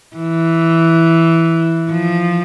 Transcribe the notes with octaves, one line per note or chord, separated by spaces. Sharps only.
E3
F3